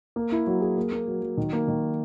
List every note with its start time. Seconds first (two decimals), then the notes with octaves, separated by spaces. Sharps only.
0.16 A#3
0.32 E4
0.47 F#3
0.61 G#4
0.78 A#3
0.92 A#3
1.08 F#3
1.22 F#3
1.37 D#3
1.53 A#3
1.68 D#3